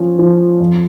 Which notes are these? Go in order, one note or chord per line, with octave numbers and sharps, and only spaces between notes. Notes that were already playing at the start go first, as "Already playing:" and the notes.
Already playing: F3 C#4
F3
F2